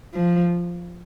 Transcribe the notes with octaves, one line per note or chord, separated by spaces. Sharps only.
F3